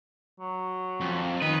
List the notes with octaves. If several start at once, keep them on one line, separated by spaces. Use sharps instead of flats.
F#3
F2
D#3 B4 D#5